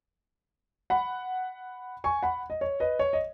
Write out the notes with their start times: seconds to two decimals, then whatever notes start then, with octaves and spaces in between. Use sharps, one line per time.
0.90 F#5 B5
2.04 G#5 C#6
2.23 F#5 B5
2.50 D#5
2.61 C#5
2.80 B4 D#5
2.99 C#5
3.13 D#5